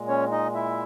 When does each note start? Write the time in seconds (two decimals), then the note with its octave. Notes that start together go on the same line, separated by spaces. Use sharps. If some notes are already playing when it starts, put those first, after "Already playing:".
Already playing: A#2 G#3
0.08 C#4 C#5
0.31 D#4 D#5
0.55 E4 E5